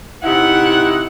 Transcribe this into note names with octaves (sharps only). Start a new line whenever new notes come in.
C3 D#4 E4 F#5